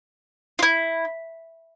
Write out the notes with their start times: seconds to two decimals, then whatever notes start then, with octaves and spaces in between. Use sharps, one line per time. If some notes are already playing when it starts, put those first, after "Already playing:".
0.59 F4
0.63 E4